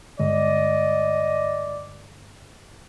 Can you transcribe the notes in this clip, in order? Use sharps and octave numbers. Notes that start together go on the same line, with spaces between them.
G2 D3 G#3 D5 D#5